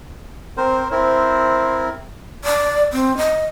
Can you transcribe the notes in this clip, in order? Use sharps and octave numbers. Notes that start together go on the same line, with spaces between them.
C4 A#4 C5
C4 E4 A#4 C5
D5
C4
D#5